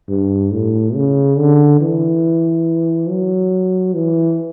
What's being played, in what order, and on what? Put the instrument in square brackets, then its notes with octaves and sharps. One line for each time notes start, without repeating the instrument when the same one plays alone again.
[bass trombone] G2
A2
C#3
D3
E3
F#3
E3